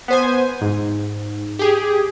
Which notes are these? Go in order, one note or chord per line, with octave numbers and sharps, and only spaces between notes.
B3 C5 G#5
G#2
G4 G#4